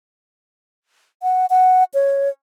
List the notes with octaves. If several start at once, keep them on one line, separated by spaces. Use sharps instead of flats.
F#5
F#5
C#5